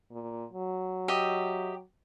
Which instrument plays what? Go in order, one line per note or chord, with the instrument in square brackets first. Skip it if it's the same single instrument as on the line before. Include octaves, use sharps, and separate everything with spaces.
[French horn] A#2
F#3
[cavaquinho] G4 D#5 E5